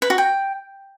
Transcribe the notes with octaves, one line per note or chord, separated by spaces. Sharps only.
B4
F#4
G5